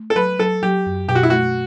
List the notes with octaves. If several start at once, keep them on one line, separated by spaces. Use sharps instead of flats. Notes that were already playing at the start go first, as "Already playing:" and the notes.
Already playing: A3
A4
F#3 B4
F#3 A4
F#3 G4
F#2
B2 G4
F#4
E4
A3 F#4